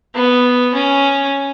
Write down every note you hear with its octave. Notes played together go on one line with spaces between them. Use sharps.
B3
C#4